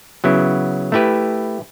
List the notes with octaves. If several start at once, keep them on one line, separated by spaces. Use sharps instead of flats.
C#3 F#3 B3 E4
A3 E4 G4 B4